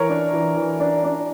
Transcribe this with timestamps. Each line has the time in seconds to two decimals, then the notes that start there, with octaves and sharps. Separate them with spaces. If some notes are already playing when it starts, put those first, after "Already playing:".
Already playing: E3 A#4 C#5
0.09 D4
0.33 E3
0.57 E3
0.80 D4
1.04 D4